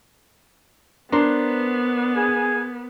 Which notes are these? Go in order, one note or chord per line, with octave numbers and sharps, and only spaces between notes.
B3 D4 A#4 C5
G#4 G#5